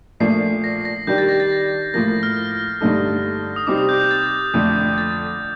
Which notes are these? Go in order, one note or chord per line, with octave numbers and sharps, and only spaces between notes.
A#2 F3 A3 D4 C7
A#6
A#6
D#3 G3 D4 G4 G6
A6
A#6
A6
A2 F3 A#3 A#6
F6
G2 D3 A3 D#4 A4
D#6
C3 G3 C4 D#4 D6
D#6
G6
G6
A6
F2 D3 A3
A6